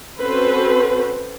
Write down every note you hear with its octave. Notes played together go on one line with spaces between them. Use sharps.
C4 C#4 F#4 A4 B4 C5